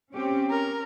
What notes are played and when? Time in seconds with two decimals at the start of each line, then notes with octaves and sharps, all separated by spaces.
0.13 C4 C#4 G4
0.50 C#4 A#4